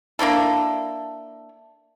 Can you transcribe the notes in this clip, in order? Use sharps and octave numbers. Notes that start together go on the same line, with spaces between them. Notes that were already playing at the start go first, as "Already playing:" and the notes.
A#3 D4 E4 A4